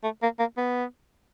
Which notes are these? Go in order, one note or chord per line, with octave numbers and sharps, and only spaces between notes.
A3
A#3
A#3
B3